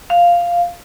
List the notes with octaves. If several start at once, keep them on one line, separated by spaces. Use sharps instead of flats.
F5